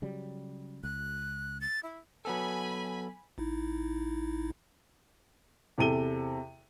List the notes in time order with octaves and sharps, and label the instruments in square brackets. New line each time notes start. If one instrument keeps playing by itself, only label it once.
[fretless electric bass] C#3 F#3 G3
[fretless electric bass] C#2 [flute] F#6
[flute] A6
E4
[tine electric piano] F#3 B3 A4 [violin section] G#5 B5
[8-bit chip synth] A1 D#4 E4
[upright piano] E2 C3 A4 D#7 G7